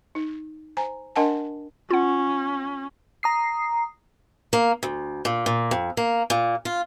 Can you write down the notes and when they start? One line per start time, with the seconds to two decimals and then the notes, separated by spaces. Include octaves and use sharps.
0.15 D#4
0.77 C5 G#5 A#5
1.16 D4 A#4 D#5 F#5 G#5 A5
1.91 C#4 F4 F#5
3.23 A#5 D#6 C7
4.53 A#3
4.83 D2
5.25 A#2
5.46 A#2
5.71 F2
5.97 A#3
6.30 A#2
6.65 F4